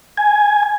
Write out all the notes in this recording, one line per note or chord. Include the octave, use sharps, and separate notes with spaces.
G#5